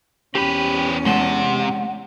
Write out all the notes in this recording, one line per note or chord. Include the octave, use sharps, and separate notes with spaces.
E2 C4 C#4 G4 B4 G5
C3 G#3 F#5 A5